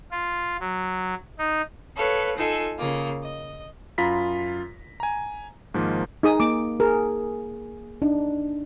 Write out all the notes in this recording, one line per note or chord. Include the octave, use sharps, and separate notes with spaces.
F4
F#3
D#4
A4 B4 C#5 F5
D#4 F4 A4 G#5 E6
C#3 A#3 F4
D#5
F#2 F4 A#5 B5 A#6 B6
G#5 A#5
G#2 D#3 F3 A#3
D#4 G#4 D#6
A#3 D6
G#4 A#4
D4 D#4